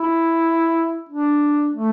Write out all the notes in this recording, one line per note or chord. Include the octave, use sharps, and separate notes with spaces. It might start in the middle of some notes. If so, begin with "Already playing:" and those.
Already playing: E4
D4
A3